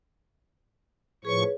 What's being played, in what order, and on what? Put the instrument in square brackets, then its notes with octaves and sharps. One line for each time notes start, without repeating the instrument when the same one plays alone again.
[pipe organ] A2 F3 C#6 [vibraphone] G#4 B4 C#5